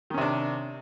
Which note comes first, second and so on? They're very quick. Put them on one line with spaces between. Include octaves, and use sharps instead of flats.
D#3 C#4 C3 D4